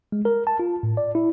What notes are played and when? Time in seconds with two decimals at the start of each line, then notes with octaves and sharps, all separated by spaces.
0.12 G#3
0.25 A#4
0.47 A5
0.59 F4
0.83 A2
0.97 D5
1.15 E4